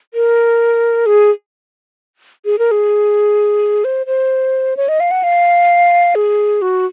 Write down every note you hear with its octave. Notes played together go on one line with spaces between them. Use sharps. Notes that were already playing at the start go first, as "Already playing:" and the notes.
A#4
G#4
G#4
A#4
G#4
C5
C5
C#5
D#5
F5
F#5
F5
G#4
F#4